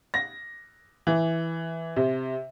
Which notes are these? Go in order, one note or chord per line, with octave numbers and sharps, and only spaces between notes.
A#6
E3
C3